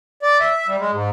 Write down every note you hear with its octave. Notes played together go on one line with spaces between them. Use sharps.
D5
E5
G3
G#3
G#2